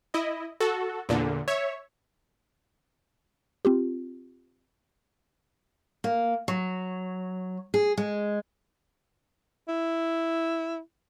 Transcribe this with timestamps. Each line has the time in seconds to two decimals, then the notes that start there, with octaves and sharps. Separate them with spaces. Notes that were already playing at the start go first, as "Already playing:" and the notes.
0.14 E4 D#5
0.60 F#4 A4
1.09 E2 A#2 D3
1.48 C#5 E5
3.65 C4 F4 G4
6.04 A#3
6.48 F#3
7.74 G#4
7.98 G#3
9.68 E4